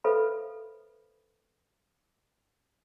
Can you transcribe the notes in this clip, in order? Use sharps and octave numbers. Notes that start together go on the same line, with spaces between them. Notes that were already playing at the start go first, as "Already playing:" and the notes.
A4 B4 C5 E5 F5 B5